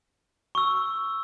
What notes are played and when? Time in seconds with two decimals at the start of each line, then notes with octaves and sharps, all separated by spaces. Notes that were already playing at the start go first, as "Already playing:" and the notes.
0.55 C#6 E6